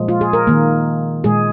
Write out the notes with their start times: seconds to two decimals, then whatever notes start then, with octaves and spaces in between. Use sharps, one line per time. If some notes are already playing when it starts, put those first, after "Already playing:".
Already playing: A#2 F3 G#3
0.09 F4
0.21 G#4
0.33 A#4
0.47 D#3 A#3
1.24 A#2 G#3 G#4